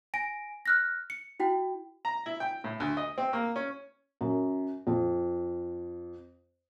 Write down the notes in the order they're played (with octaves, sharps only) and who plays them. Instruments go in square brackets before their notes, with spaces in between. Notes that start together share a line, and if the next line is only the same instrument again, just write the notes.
[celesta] G#5 A#6 D7
F6 F#6 A#6
C#7
E4 F#4 G5
[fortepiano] A#5
E4
G5
A2
D2
D#5
C4
A#3
C#4
[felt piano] F#2
F2